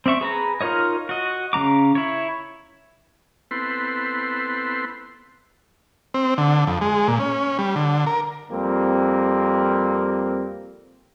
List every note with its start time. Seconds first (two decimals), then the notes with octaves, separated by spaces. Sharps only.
0.06 C4 D5 E5 C#6
0.21 G#4 B4 A#5
0.61 D#4 F4 A#4 C#5 D#5
1.09 F#4 D#5
1.53 C#3 C4 A#5 D6
1.95 E4 C#5
3.51 B3 C4 E4 A4 B4 C6
6.14 C4
6.38 D3
6.67 F2
6.81 G#3
7.08 A#2
7.19 C#4
7.59 G3
7.76 D3
8.06 A#4
8.51 F2 G3 A#3 C4